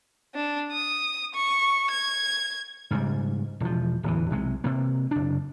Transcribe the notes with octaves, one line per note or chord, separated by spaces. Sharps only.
D4
D#6
C#6
G#6
G#2 C#3 G3
E1 F3
D1 E2 E3
B1 C3 G#3
C3 A#3
F#1 D4